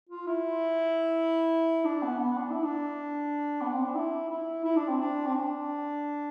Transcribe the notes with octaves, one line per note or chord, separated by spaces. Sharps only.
F4
E4
D4
B3
B3
D4
E4
D4
B3
C4
D4
E4
E4
E4
D4
C4
D4
C4
D4